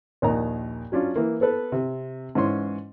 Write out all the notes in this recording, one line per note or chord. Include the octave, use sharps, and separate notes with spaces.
A#1 D#2 D#3 A#5
F#3 C#4 D4 F4
E3 A#3
B3 A4 B4
C3
G#2 E3 C#4 C6